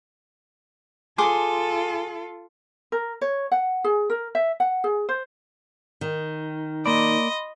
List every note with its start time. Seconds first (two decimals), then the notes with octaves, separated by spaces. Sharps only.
1.18 F4 G#4 A4 C6 D6
2.92 A#4
3.21 C#5
3.51 F#5
3.84 G#4
4.10 A#4
4.35 E5
4.60 F#5
4.84 G#4
5.09 C5
6.01 D#3
6.86 A#3 D5 D#5 B5 C6